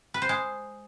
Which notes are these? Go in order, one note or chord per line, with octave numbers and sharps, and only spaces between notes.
B4
C5
G#3